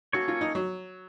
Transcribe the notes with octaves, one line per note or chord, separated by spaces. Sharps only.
A#3 C#4 F#4 A4 C#5
F4
D#4
F#3